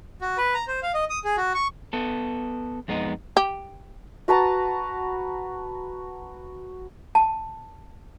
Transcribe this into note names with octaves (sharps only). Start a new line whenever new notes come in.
F#4
B4
A#5
C5
F5
D#5
D#6
G#4
F#4
C#6
B3 A4
F2 G#3 B3 D#4
G4
F#4 B4 A5 A#5
A5